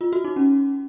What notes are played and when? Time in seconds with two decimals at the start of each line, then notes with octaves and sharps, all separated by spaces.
0.01 F4
0.13 F#4
0.24 D#4
0.36 C#4